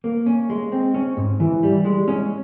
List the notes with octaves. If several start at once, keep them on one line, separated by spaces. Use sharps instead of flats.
A#3
C#4
G#3
C4
C#4
G#2
E3
G3
G#3
C#4